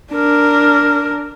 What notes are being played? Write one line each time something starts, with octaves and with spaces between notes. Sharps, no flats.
D4 A#4